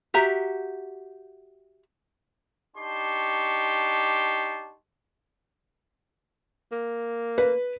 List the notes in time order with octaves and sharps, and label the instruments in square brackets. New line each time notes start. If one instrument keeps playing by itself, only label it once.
[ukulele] F#4 G4 E5 A#5
[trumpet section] D4 D#4 G4 A5 C6 C#6
[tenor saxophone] A#3
[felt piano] B4